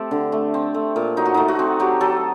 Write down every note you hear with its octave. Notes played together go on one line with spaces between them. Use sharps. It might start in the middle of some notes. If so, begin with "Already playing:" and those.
Already playing: A3 C4 G4 A4
D3
A3
C4
A3
A#2
F#3 D#4
F#4
A3 D#4
F#4
C4
F#3 G4
F#3 A4